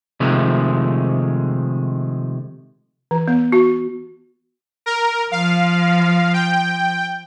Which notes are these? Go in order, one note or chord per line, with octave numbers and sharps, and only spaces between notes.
C3 D#3 F3 G#3 A3
E3
B3
F#4
A#4
F3 F5
G5